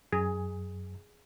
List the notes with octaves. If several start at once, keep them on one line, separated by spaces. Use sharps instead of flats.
F#2 G#4